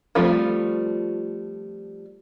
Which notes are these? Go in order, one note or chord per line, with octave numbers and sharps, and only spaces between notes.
F3 G3 A3 C4 F4